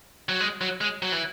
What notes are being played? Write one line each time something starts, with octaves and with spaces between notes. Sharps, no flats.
F#3
G#3
F#3
G#3
F#3
E3